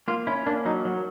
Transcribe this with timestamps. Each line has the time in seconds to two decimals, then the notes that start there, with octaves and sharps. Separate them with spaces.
0.08 A#3 F4
0.27 C#4 E4
0.46 A#3 D4
0.65 F#3 D#4
0.85 F#3